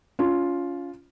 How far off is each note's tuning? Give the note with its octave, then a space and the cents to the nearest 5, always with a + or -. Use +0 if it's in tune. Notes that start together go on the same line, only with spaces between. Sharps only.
C#4 +30 F4 +0